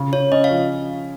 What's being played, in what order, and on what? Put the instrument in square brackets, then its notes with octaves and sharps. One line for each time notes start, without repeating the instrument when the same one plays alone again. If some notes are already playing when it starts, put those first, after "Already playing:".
Already playing: [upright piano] C#3
[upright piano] C#3 [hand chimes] C#5
[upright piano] C#4 [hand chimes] D#5
[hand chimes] F5
[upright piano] F3